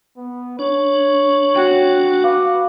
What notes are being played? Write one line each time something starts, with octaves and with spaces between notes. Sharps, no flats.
B3
D4 C#5
F#4 G5
B4 F5 D6